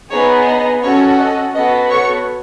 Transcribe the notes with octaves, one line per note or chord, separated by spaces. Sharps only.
B3 D#4 G#4 C#5
D#5
C#4 F#4 A4 C#5
D#5
B3 F#4 A4 D#5
C#5 C#6